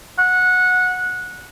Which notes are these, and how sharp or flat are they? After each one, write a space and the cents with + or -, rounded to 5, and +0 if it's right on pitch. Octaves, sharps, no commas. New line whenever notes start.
F#5 -15